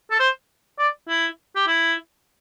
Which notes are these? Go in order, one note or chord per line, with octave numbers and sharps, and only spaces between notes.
A4
C5
D5
E4
G4
E4